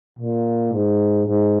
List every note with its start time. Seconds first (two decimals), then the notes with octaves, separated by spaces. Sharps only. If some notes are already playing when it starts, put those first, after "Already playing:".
0.19 A#2
0.72 G#2
1.25 G#2